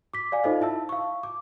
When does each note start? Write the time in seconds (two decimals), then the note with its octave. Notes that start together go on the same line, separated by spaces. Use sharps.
0.14 D6 B6
0.32 D5 F5 G#5
0.44 D#4 F4 A4 C5 D#5 F5
0.61 E4 E5 A5 E6
0.89 F5 C#6
1.23 D6